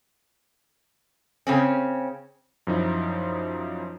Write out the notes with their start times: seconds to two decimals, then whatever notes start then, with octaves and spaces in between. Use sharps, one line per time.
1.47 C#3 C4 C#4
2.67 F#2 F3 D#4 E4